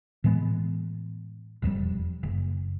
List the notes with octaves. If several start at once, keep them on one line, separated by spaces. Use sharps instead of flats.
A2 E3 G#3 B3
E1 F2 E3 G3
F#1